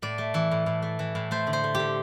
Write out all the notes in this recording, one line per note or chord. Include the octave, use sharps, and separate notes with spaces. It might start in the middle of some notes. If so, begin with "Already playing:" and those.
A2 D5
A3
E3
A2
A2
A3
E3
A2
A3 C5
D3
C5
A3
D3 G4